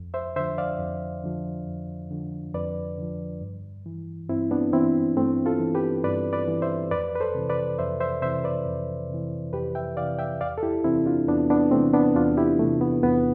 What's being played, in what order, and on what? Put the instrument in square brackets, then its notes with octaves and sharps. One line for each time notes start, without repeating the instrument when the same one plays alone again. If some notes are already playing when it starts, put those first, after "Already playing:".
Already playing: [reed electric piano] F2
C5 E5
D3 C5 E5
F3
D5 F5
F2
D3 F3
F2
D3 F3
F2 B4 D5
D3 F3
G2
E3
G2 C4 E4
B3 D4
E3 C4 E4
G2 A3 C4
F4 A4
E3
G4 B4
G2 B4 D5
B4 D5
E3
C5 E5
F2 B4 D5
B4
A4 C5
C3 E3
B4 D5
F2 C5 E5
C5 E5
C3 C5 E5
E3
B4 D5
F2
C3 E3
F2 G4 B4
E5 G5
C3 E3 D5 F5
E5 G5
E2 D5 F5
A4
E4 G4
C3 E3 C4 E4
D4 F4
E2 B3 D4
B3 D4
C3 A3 C4
E3
B3 D4
E2 D4 F4
E4 G4
E3 A3
C3
B3
E2 B3